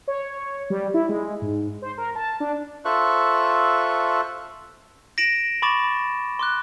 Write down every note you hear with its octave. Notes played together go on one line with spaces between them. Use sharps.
C#5
G3
E4
G#3
G#2
C5
A#4
A5
D4
F4 A4 C5 E5 C#6 F#6
A#6 D7 E7 F#7
B5 C#6 D6 A6 E7
C6 D6 F#6